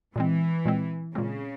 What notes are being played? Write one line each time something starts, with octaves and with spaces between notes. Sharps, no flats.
A#2 E3 G#3 C4
A#2 G#3 C4
A#2 C#3 G#3 C4